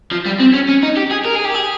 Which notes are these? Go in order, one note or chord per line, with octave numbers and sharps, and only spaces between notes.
F3
G3
C4
C#4
C#4
D#4
G4
G#4
A#4
G#4
G4
G#4